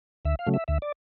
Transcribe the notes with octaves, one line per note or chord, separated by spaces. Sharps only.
D2 E5
F5
C#3 F#3 A3
E5
D2 E5
D5